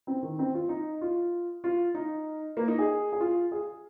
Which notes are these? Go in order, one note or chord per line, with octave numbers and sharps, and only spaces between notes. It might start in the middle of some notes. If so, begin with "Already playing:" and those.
C4
D#3
C4
F4
D#4
F4
F4
D#4
A#3
D#4
G#4
G#4
F4
G#4